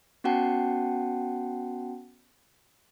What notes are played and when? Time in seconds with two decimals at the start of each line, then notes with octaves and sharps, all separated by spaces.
0.24 B3 C#4 F#4 F#5 G5 A5